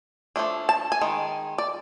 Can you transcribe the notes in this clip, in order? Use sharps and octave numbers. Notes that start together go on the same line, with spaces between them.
F3 A3 D4
A5
G#5
D#3 G#3
D5